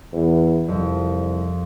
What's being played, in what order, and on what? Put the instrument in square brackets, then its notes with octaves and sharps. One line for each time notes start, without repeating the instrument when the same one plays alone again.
[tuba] E2
[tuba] C2 [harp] F2